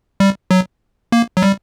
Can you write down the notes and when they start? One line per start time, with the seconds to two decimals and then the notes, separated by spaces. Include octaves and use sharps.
0.20 G3
0.51 F#3
1.12 A#3
1.37 F#3
1.42 G3